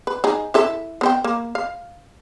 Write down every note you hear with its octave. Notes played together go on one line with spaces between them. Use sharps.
B4
D#4 G#4
E4 A4 E5
B3 C5 G5
A#3
F5